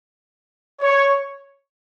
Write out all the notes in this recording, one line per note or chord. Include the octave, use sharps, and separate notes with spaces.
C#5